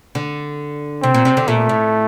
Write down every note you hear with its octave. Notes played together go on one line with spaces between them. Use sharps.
D3
C3 C4
A#2
C3
D3
A#2 A3
A2